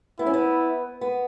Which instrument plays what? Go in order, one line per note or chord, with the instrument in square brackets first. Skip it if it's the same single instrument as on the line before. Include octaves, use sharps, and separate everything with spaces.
[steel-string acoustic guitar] B3 [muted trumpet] E4
[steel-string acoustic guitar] C#4
B3
B3